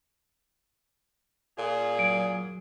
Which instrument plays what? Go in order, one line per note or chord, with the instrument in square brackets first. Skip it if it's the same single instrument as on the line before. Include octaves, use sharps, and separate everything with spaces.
[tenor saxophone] A#2 [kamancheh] G#4
[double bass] F#3 [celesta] D7